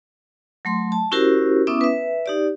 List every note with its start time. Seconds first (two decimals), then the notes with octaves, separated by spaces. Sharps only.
0.65 F#3 A3 C6
0.92 A5
1.12 C#4 E4 F#4 G4 A#4 C5
1.67 B3 C#4 E4 E5 D6 D#6
1.81 B4 E5
2.26 D#4 G4 D5